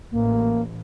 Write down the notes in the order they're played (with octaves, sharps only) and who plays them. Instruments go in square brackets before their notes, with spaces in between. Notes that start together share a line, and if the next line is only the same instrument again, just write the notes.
[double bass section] A1 [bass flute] A#3